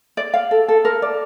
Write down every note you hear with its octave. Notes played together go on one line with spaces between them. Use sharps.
D5
F5
A4
A4
A#4
D5